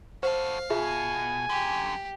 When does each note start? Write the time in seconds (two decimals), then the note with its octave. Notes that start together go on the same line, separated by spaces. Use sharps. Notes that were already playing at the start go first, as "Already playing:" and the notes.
0.23 F#4 A4 C5 F5
0.70 B2 F4 G#4 E5 G#5
1.49 F#2 D3 G4